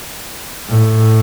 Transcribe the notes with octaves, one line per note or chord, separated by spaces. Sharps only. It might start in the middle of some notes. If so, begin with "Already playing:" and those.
A2